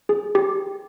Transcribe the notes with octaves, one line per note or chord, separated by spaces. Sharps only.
G#4
G4